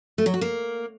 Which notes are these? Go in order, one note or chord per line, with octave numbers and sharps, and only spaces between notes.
A3
F#3
F#4
A#3